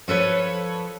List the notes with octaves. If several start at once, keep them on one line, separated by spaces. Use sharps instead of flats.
F3 A4 B4 C#5